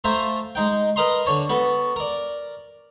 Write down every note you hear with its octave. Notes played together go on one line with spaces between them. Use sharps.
A3 F4 C5 E5 A#5
G#3 D#4 G5
A#4 B4 D#5 A#5 C6
D3 C#5 A5
B3 F#4 A4 B4
A#4 D5